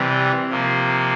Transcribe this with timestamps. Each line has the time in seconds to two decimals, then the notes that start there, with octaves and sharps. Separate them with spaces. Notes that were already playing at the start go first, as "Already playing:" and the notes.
Already playing: C3 E3 G3
0.50 C3 F3 A#3